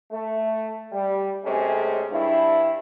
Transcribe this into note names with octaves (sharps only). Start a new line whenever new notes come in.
A3
G3
C3 G#3 A3 C#4 G#4
G2 E4